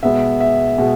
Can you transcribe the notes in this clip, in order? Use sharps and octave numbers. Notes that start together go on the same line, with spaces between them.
B2 G#3 B3 E5
E5
B2 G#3